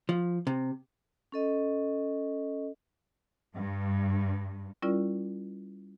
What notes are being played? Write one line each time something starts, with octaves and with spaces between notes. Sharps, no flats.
F3
C3
C#4 A4 D#5
G2
G3 C#4 E4 F4 A#4 D5